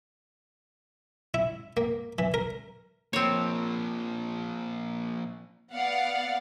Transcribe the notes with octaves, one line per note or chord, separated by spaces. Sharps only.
E4
A#3
E3
A#4
F3 A#3 C4 C#5
B3 D5 F5 F#5